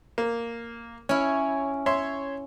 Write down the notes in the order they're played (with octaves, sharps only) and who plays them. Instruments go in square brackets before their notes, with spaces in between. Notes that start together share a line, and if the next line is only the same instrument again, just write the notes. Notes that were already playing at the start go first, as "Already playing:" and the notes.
[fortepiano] A#3
[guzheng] C#4 E4 [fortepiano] C#5
[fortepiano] C#5 E5 C6